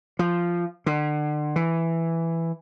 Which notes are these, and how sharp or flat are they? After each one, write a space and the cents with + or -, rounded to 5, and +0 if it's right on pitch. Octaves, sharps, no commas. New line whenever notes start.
F3 -10
D3 +35
E3 +5